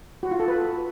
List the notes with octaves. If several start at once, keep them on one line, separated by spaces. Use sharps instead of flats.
F#4
F4
A4
B4